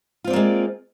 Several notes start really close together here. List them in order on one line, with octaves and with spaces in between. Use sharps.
F4 C4 D5 A#3 G#3